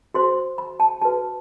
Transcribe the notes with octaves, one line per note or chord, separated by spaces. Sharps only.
F#4 C5 C6
B5
A5
F#4 B4 A5